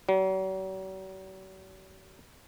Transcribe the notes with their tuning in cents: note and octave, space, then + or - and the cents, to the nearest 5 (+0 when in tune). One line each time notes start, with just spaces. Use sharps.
F#3 +45